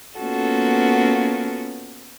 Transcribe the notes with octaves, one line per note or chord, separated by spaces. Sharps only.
A#3 B3 C#4 F4 F#4 A4